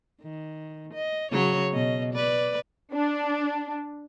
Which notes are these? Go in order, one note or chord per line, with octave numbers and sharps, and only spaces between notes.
D#3
D#5
C#3 F#3 C#5
B2 D#5
B4 D5
D4